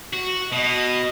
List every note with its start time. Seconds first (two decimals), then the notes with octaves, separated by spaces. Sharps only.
0.13 F#4
0.52 B2 D#5